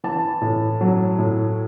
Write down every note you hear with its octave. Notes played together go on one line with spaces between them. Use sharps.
E3 A5
A2
F#3
A2